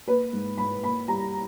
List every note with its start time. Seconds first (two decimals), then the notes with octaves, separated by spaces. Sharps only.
0.08 A#3 B4
0.33 G#2
0.58 G#2 B5
0.83 A#3 B5
1.08 G3 A#5